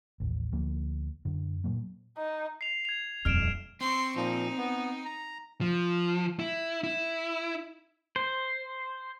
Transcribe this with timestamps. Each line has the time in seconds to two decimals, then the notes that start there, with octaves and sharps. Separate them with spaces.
0.20 A1 D#2
0.52 D2 F3 A#3
1.25 F#2 D3
1.64 A#2 F#3 A#3
2.18 D#4
2.61 C7 F7
2.85 G#6 F7
3.25 D#1 F2 F6 D7 E7
3.81 C4 C6 C#6
4.16 A#2 F3 D#4
4.58 B3
5.05 A#5
5.61 F3
6.39 E4
6.84 E4
8.16 C5